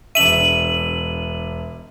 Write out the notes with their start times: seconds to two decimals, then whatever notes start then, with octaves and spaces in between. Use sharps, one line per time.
0.15 E1 D4 E5 D#7 F#7